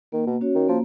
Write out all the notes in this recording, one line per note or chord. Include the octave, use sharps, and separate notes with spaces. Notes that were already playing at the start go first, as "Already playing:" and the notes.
D#3 A#3
B2
C#4 F#4 C#5
D#3
F3 A#3